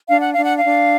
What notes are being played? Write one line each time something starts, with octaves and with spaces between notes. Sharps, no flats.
D4 F5
F#5
D4 F5
F#5
F5
D4